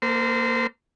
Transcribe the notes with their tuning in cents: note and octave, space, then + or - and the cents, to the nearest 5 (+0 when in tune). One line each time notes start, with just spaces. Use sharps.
A#3 +0 A4 +45 C5 -30